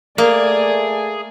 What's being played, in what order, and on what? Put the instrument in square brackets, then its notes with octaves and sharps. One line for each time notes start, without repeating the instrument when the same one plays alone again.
[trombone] A3 [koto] A#3 [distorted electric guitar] G#4 [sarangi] D5